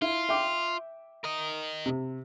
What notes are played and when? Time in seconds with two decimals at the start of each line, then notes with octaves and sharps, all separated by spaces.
0.02 E4 F4
0.29 E5 G5 D6
1.24 A#4 D#5
1.86 C3